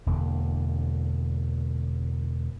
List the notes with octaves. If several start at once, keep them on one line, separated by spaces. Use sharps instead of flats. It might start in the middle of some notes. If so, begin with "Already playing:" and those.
E1 E2 D3 A#3